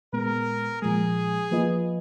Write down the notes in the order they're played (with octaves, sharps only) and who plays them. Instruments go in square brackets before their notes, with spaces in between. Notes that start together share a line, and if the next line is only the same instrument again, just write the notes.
[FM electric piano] A#2 G#3 B3 [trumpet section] A#4
[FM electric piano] A#2 F3 G#3 [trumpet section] G#4
[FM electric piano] F3 A#3 F4 B4 D#5